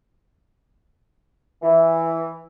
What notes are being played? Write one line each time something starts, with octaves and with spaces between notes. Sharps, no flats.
E3